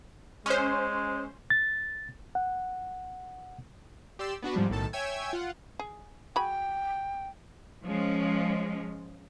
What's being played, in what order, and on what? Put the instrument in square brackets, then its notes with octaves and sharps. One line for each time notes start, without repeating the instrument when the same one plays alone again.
[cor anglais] G#3 [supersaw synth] C#4 C5
[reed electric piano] A6
F#5
[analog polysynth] G4 D5 C6 E6
B3 D4 F#4 B4
G#2 C3 F3 G3
B1 A2 D#3 A4 A5
C#5 E5 G5 G#5 E6 G#6
F4 F#5
[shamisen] G#4
[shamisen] F#4 G#4 B5 [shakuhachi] G5
[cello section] F3 G#3 C#4